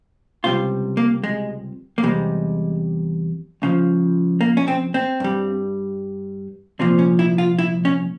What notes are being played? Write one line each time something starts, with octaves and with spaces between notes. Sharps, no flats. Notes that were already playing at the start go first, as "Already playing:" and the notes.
C#2 C3 G3 F4
A#3
G#3
A#3
E2 C3 G3 G#3
C#2 C#3 F3
A#3
C#4
C4
C4
G2 G3
C2 A#2 F3 C4
C#4
E4
F4
E4
C#4